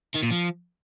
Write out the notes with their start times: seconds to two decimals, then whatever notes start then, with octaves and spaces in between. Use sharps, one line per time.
0.14 D#3
0.22 A#2
0.31 F3